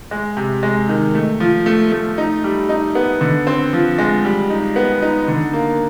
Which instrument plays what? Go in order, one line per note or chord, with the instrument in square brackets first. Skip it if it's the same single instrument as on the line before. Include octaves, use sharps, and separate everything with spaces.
[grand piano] G#3
C3
G#3
D#3
A3
F3
A3
A3
D#4
G3
D#4
B3
D3
C4
F3
G#3
G3
D#4
B3
D#4
D3
A#3